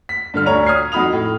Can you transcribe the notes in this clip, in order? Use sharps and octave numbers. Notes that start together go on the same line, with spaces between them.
B6
G2 D3 F6
D2 D4 C#5 A#5 F7
D#6 F6 G#6 C7
F2 D#4 F#4 B5 D#6 F7
A2